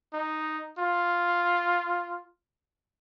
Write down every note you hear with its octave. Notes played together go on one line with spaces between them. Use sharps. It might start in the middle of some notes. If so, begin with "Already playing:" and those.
D#4
F4